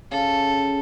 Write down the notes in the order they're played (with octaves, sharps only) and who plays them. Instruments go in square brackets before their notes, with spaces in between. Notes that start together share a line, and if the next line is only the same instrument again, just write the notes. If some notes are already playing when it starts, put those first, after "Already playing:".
[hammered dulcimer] C#3 [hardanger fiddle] A4